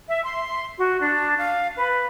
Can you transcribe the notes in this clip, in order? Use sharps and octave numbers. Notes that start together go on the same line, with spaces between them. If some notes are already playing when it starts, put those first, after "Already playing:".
E5
C6
F#4
D4
F5
B4